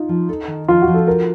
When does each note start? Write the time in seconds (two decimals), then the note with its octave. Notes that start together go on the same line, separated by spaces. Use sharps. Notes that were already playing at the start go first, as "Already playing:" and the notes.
Already playing: D#4 F4
0.09 F3
0.29 A4
0.48 D#3
0.68 F3 F4
0.82 F#4
0.88 F3
0.94 A4
1.07 F#4 A#4